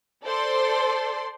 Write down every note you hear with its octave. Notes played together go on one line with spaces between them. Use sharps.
A4 C5 D5 C6